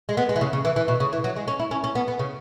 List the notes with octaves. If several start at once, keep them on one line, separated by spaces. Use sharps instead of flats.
G#3
B3
G#3
E3
C#3
C#3
E3
E3
B2
C#3
E3
F#3
G#3
C#4
E4
C#4
C#4
B3
B3
C#3